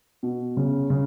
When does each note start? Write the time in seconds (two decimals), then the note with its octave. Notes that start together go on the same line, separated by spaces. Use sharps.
0.23 B2
0.57 C#3
0.90 C#3